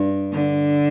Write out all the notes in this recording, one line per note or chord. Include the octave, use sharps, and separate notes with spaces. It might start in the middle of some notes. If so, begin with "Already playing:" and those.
Already playing: G2
D3